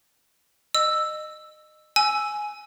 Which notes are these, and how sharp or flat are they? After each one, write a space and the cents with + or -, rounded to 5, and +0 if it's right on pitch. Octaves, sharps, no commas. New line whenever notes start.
D#5 -20 E6 +0
G#5 +10 E6 +0